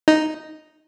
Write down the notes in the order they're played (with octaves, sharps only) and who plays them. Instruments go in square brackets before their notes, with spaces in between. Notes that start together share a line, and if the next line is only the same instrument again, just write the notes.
[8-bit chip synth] D#4